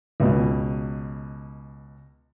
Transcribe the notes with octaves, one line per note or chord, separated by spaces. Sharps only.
C#2 B2